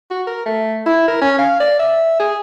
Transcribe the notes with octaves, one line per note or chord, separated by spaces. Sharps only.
F#4
A#4
A3
E4
A#4
C#4
F5
D5
E5
G#4